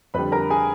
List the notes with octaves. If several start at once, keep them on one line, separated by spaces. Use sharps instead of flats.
F2 D3 G3 B4 B5
A#4 A#5
G#4 G#5